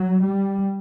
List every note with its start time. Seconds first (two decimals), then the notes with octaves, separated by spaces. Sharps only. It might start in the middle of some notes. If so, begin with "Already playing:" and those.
Already playing: F#3
0.24 G3